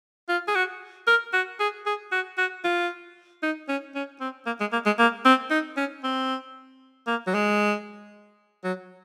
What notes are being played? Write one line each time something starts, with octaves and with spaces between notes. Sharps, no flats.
F4
G#4
F#4
A#4
F#4
G#4
G#4
F#4
F#4
F4
D#4
C#4
C#4
C4
A#3
G#3
A#3
G#3
A#3
C4
D#4
C#4
C4
A#3
F#3
G#3
F#3